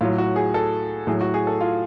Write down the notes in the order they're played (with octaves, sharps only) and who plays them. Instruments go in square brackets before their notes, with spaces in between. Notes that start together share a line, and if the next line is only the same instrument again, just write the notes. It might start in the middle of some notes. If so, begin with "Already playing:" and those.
[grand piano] A2 F#3 F4
F#4
G#4
A4
A2 F#3 G#4
F#4
G#4
A4
F4